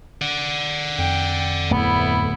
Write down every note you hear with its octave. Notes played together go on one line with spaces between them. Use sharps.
D5 F#5
F2 G5
D1 A3 B3 E4